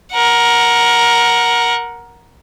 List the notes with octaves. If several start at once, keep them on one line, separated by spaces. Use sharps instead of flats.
A#4 F#5